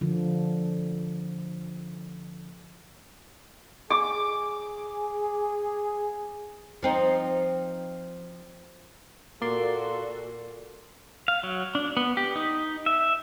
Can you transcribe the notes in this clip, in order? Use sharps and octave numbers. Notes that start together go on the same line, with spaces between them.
D3 F3
G#4 D6
F3 C4 D#4
A#2 A#3 F#4 A4 D5 C6
F5
F#3
D4
B3
G4
D#4
E5